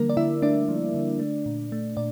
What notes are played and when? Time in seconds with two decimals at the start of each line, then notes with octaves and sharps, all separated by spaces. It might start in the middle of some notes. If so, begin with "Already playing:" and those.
Already playing: D3 F3 G3 A#3 A#4
0.09 D5
0.17 D3 E4 E5
0.42 A3 D4 D5
0.68 F3
0.94 D3
1.19 A3
1.46 A#2
1.72 A3
1.97 A#2 D5